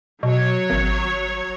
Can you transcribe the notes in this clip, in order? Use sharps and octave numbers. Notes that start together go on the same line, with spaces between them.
B2 F#3 C#5
G#1